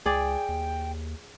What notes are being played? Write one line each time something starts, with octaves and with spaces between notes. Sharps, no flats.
C#2 G#4 D5 G5
D#2